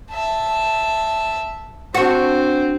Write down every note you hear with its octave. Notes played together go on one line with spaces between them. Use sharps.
E5 A5
C4 D4 F#4